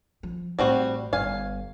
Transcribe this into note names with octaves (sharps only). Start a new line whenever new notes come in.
F3
A1 G3 C4 F#4
G1 F5 G#5